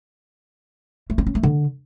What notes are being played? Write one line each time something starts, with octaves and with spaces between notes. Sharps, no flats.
A3
C4
C#4
A3
D3